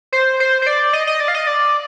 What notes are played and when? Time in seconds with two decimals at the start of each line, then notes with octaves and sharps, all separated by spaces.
0.12 C5
0.40 C5
0.62 C5
0.67 D5
0.93 D#5
1.07 D#5
1.20 D5
1.28 F5
1.34 D#5
1.47 D5